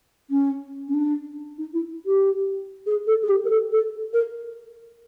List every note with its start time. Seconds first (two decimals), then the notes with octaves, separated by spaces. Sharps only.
0.30 C#4
0.88 C#4
0.93 D4
1.58 D#4
1.73 E4
2.05 G4
2.86 G#4
3.06 A4
3.23 G#4
3.28 G4
3.44 A#4
3.49 A4
3.71 A4
4.13 A#4